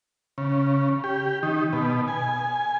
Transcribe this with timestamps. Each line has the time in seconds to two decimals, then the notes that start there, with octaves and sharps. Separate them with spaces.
0.38 C#3
1.04 G4
1.43 D#3
1.73 B2
2.08 G#5